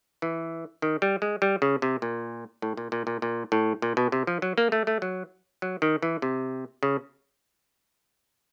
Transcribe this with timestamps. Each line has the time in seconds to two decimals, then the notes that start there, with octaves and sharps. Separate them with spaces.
0.22 E3
0.82 D#3
1.02 G3
1.22 G#3
1.42 G3
1.62 C#3
1.82 C3
2.02 A#2
2.62 A2
2.77 A#2
2.92 A#2
3.07 A#2
3.22 A#2
3.52 A2
3.82 A#2
3.97 B2
4.12 C3
4.27 F3
4.42 F#3
4.58 A#3
4.72 A3
4.87 A3
5.02 F#3
5.62 F#3
5.82 D#3
6.02 E3
6.22 C3
6.83 C#3